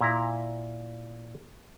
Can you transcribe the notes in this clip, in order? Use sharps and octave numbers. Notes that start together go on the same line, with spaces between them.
A#2 E4 A#5